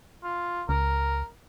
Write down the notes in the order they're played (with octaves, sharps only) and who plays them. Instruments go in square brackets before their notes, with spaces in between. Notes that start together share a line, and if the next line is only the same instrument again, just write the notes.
[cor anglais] F4
[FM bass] C#2 [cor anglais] A#4